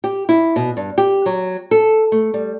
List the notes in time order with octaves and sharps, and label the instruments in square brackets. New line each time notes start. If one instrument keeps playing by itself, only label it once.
[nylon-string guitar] G4
E4
B2
G2
G4
F#3
A4
A3
G3